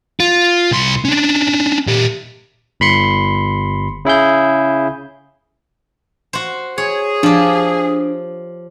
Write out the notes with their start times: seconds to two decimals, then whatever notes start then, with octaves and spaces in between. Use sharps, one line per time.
0.20 F4
0.71 C2 C6
1.05 C#4 D4
1.87 A#2 G4
2.80 G1 B5 C6 C#7
4.05 C#3 E4 G#4 G6
6.33 F#4 C5
6.78 G#4 C#5
7.23 F3 D4 G4